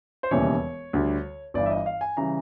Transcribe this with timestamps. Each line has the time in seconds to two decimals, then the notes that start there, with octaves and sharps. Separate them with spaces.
0.23 C5
0.31 E1 D#2 C#3 E3 G3 C#5
0.93 D2 D3 G3
1.54 G1 G2 E3 D5
1.66 E5
1.70 D#5
1.86 F5
2.01 G#5
2.17 C#3 E3 G3 A#5